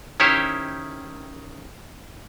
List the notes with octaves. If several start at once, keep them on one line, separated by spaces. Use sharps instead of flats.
D#3 C#4 E4 G4 C5 C#5